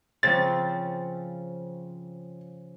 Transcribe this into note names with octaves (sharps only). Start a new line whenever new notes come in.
C#3 F3 C4 C#5 A6